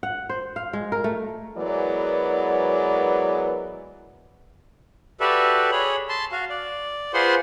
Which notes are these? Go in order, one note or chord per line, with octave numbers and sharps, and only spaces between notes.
F#5
C5
F5
G#3
A#4
A3
E3 F#3 G#3 B3 A#4 D5
F#4 G4 A4 B4 D5 E5
G#4 C#5 B5
A5 C6
F#4 F5
D5
F4 G#4 B4 C5 F#5 C6